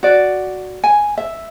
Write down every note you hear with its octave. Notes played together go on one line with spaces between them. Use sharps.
F#4 D5
G#5
E5